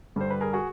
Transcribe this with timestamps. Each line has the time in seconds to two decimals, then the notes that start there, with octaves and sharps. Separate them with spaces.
0.16 G2 D3 G3 C5
0.30 B4
0.41 G#4 A#4
0.53 F#4 G#4